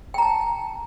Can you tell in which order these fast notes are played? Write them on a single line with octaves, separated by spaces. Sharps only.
G5 A#5 A5